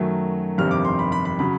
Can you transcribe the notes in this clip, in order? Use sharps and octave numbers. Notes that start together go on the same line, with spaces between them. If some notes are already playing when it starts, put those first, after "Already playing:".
Already playing: F#2 D#3 F#3 A3
G1 F2 C3 D#3 G3 F6
D6
C6
B5
B5
B5
C#3 F#3 B5